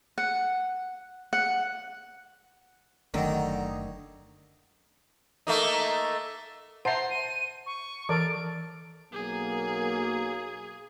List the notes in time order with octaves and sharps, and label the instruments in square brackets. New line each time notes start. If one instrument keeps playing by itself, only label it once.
[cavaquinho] F#5
F#5
[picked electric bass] F#1 A3 D4 [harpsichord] D3 F#3 D#4 [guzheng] D#3
[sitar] A3 A#3 D#4
[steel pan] C5 A5 A#5 [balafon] E5 F#5 [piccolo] C6
[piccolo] D#7
C#6
[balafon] E3 [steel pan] A4 A#4 D5 [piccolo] D7
[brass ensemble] B1 F#3 A#3 [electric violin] G#4